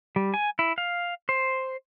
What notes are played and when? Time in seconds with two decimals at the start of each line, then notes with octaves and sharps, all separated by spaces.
0.16 G3
0.34 G#5
0.59 E4
0.78 F5
1.29 C5